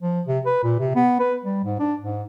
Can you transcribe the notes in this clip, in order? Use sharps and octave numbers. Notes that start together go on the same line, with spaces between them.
F3
C3
B4
A#2
C3
B3
B4
G3
G#2
D4
G#2